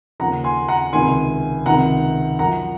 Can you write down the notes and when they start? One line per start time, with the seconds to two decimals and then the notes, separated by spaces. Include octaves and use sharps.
0.20 D#2 C#3 F3 F#5 A#5
0.44 G#5 C6
0.68 F#5 A#5
0.93 C#2 C3 D#3 G#5 C6
1.66 C#2 C3 D#3 F#5 A#5
2.39 F#2 F3 F#5 A#5